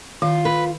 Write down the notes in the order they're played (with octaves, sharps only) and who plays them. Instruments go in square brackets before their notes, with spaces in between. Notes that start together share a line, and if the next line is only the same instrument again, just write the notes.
[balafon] D#3 [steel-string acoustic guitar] F4
[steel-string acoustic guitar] B4